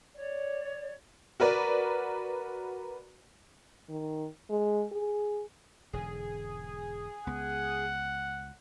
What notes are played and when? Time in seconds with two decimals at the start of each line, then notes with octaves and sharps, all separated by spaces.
0.15 C#5 D5
1.40 F#4 A#4 B4 D5
3.89 D#3
4.50 G#3
4.92 G#4
5.93 E1 G#2 D3 G#4
7.27 C#2 B3 F#5